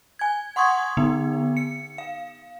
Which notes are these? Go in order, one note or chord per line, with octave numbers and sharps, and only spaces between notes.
G#5 G#6
F#5 C6 C#6 D#6 G#6
D3 B3 D#4
C#7
F5